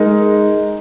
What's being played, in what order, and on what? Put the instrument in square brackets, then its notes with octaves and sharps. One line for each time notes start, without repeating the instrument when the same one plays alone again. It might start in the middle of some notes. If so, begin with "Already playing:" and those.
Already playing: [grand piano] G#3 D#4 A#4